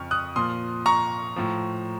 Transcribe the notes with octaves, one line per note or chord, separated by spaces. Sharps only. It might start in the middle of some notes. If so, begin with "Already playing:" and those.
Already playing: F2 C#3 F3 C#6 F6
D#6 F#6
A#2 F3 C6 D#6
A#5 C#6
A2 F3